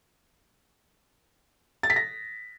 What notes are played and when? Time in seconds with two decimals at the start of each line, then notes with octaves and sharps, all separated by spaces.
1.83 A6
1.90 B6
1.96 A#6